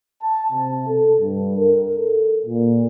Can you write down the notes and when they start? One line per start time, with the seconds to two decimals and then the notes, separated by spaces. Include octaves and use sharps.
0.22 A5
0.52 C3
0.87 A4
1.19 G2
1.58 A#4
1.96 A4
2.46 A#2